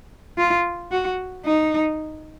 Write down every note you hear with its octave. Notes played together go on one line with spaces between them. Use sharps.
F4
F#4
D#4